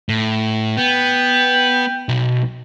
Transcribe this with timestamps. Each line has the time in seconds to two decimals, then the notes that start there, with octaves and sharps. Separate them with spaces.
0.09 A2
0.77 B3 G5
2.09 B1